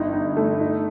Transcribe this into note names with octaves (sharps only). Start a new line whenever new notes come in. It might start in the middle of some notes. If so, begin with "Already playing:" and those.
Already playing: G1 D#4
D#4
A3
D#4